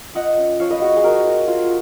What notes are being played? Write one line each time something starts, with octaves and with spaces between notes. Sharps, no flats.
F4 D#5 F#5
C#4
F3 C#5 F5
B4 D#5
G#3 F#4
G#4
G#3 F#4 A#4
F4
F4